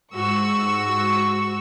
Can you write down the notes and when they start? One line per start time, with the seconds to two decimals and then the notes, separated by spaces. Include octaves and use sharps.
0.15 G#2 F#4 C#6 E6